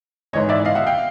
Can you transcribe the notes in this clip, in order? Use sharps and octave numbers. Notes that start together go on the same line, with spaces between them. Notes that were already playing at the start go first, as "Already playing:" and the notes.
G#2 E3 G#3 C#5 D#5
D5 E5
D#5 F5
E5 F#5
F5 G5